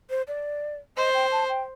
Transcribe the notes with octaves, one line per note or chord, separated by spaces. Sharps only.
C5
D5
C5 D#5
G5
A5
G5